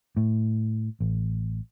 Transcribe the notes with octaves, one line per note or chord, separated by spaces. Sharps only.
A2
A1